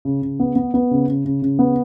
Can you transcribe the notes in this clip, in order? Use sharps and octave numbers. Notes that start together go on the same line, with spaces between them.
C#3
C#3
B3
B3
B3
C#3
C#3
C#3
C#3
B3